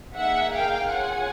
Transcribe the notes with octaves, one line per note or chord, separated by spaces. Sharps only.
A#3 D#4 G#4 E5 F#5
F5 G5
C#4 F4 G#4 F#5 G#5